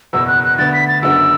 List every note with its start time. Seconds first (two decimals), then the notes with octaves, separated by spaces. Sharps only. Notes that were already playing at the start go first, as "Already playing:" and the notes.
0.13 F#1 E2 B2 B3 E6
0.27 F#6
0.44 F#6
0.58 D2 D3 B3 A6
0.73 B6
0.88 A6
1.03 F#1 F#2 D3 B3 F#4 E6